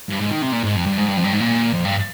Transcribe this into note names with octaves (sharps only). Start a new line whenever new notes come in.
G2
G#2
D#3
C3
A#2
G#2
F2
G2
G#2
G2
F2
G2
G#2
A#2
F2
G2